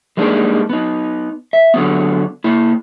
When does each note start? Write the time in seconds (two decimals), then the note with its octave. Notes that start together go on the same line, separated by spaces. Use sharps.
0.17 G3 G#3 A#3 D4 D#4
0.69 B3 D#4
1.53 E5
1.74 D3 F#3 B3
2.44 A#3 E4